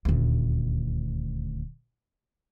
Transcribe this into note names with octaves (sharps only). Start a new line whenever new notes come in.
D#1 D2